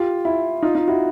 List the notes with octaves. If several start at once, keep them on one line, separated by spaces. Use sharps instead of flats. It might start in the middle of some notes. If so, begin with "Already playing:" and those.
Already playing: F4 G4
E4
D#4 F4
D#4 F4
E4 F#4